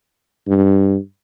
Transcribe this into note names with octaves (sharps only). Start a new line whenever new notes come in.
G2